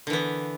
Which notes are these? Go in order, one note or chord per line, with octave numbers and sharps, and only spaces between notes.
D3 E3 B3